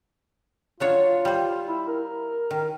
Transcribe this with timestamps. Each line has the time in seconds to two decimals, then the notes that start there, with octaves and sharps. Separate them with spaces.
0.80 F#3 D4 F4 C#5
1.04 F4
1.25 G3 C5
1.68 E4
1.88 A#4
2.51 D#3